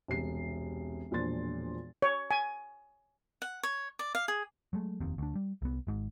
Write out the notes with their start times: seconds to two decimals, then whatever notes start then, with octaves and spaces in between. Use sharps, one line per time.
0.08 E1 C2 C7
1.11 E1 A#2 F3 D4 C6 A6
2.02 C#5
2.31 G#5
3.42 F#5
3.63 C#5
3.99 D5
4.15 F5
4.28 G#4
4.73 F#3 G#3 A3
5.00 F1 D#2 C3
5.18 D2 D4
5.36 G3
5.62 C2 B3
5.87 G#1 G#2